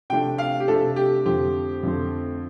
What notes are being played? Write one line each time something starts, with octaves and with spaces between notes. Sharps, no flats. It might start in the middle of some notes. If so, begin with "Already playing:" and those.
C3 F3 A3 D4 G5
F5
G4
C3 F3 A3 D4 A4
G4
F2 D3 F3 A3 C4 G4
F2 D3 F3 A3 C4